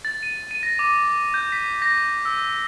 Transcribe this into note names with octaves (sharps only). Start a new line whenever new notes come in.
A6
D#7
D#7
A#6
D6
G6
B6
A#6
E6